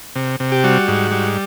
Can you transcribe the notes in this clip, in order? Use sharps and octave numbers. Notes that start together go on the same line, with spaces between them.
C3
C3
G4
G3 F#4
G#2
G3